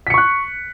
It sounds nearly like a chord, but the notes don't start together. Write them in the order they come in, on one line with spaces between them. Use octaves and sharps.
B6 C#7 C#6 F#6